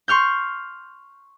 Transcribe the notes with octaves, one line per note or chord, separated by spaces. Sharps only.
C6 C#6 F6 G6